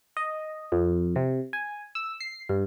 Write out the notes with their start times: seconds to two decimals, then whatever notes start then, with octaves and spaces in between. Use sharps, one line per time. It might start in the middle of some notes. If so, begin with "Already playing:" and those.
0.17 D#5
0.72 F2
1.16 C3
1.53 G#5
1.95 E6
2.20 C7
2.49 G2